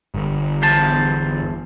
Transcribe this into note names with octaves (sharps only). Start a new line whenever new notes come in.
G1
E2 C5 A5